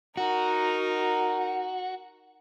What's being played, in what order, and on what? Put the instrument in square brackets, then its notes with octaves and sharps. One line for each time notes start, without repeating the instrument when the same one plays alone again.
[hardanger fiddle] D#4 A#4 [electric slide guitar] F#4